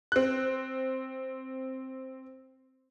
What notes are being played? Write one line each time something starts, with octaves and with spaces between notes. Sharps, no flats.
C4 F#6